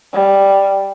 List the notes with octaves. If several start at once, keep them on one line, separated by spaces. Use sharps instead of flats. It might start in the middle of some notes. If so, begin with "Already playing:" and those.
G3